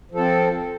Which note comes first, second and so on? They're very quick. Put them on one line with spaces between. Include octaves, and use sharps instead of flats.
F3 A4 C4